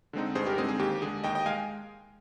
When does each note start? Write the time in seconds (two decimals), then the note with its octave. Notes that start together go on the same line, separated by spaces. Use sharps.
0.13 D3 G#3 C4 D#4
0.35 G2 G#4 C5
0.46 G4 A#4
0.57 D3 G#3 C4 D#4 G#4
0.68 G#4
0.79 D#2 G4
1.02 D3 G#3 G#4
1.24 D#2 D#5 G5
1.35 D#5 G5
1.46 G#3 F5 G#5